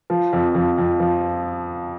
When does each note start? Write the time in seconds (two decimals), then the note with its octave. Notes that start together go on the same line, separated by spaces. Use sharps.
0.10 F3
0.33 F2
0.55 F2
0.78 F2
1.00 F3